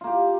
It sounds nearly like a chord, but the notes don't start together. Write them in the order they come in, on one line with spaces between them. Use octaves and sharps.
F4 A#3 G4